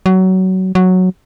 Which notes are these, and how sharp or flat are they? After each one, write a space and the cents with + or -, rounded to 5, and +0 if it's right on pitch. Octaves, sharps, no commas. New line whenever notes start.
F#3 +20
F#3 -5